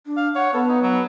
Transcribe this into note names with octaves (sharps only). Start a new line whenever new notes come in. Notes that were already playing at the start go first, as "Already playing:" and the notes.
D4
F5
C#5 F#5
B3 A4 B4
D#4
F#3